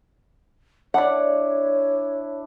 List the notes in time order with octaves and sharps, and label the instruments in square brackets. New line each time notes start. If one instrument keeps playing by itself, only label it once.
[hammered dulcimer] D4 E4 [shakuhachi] C#5 [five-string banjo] D5 F#5